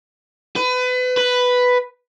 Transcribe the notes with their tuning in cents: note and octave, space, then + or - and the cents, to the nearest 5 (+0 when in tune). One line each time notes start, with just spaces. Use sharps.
B4 +30
B4 +5